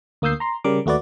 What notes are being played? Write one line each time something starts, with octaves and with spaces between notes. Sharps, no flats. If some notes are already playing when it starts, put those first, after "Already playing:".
D2 A#3 D#6 E6 G6 C7
A#5 C6
C#3 G3 A#4 D6
D#2 A3 F#4 B4 D5